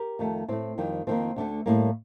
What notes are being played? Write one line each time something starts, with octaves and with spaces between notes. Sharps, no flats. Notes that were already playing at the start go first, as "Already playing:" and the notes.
Already playing: G4 A#4
F2 D#3 A3
A2 A3 C4
F2 D#3 G3
F2 D#3 A#3 C4
D2 D3 A3
A2 G3 A#3